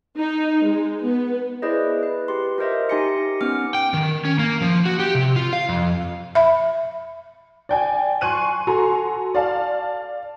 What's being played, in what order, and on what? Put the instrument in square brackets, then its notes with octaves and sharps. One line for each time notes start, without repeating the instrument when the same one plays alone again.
[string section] D#4
G#3
B3
[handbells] E4 G#4 B4 C5 D5 D#5
B4
G4 C6
F4 A#4 C5 D#5 E5
D#4 G4 G#5 C6 A#6 C#7
B3 C#4 D6 F6 C#7
[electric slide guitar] G5
D#3
C#4
A#3
F3
F#4
G4
C3
F4
F5
F2
[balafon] E5 B5
[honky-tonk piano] D5 G5 G#5
G#5 C6 C#6 F#6 D#7
F#4 A4 G#5 A#5 C6
D5 F5 A5